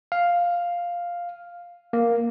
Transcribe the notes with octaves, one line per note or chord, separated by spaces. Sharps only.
F5
A#3